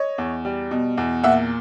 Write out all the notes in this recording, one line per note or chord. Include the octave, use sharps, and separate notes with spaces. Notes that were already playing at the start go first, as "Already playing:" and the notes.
Already playing: C#5 D#5
E2
G3
B2
E2
A#2 E5 F#5